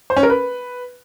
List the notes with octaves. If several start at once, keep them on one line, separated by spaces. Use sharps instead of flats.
C5
C#4
A#4
B4